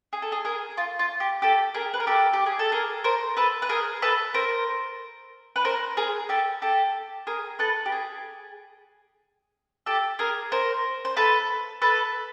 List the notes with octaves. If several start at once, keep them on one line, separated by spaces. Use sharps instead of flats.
G#4
A4
G#4
G#4 A#4
F4
F4
G4
G4 A4
G#4 A#4
B4
A#4
G4 A4
G4
G#4
A4
G#4 A#4
A#4 C5
A4 B4
B4
G#4 A#4
A4 B4
A#4 C5
B4
A#4 C5
G#4 A#4
G4 A4
G4 A4
G#4 A#4
A4 B4
G4
G#4
G4 A4
G#4 A#4
A#4 C5
C5
A4 B4
A4 B4